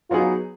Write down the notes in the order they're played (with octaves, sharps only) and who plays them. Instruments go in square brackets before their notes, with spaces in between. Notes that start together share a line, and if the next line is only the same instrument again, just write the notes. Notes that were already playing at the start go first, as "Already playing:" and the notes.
[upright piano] F#3 B3 D#4 G#4 [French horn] F4